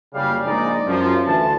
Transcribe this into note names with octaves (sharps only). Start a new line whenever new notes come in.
F#1 C#3 G3 F5
A#1 G#3 D#4 D5
F#2 F3
D2 E3 A5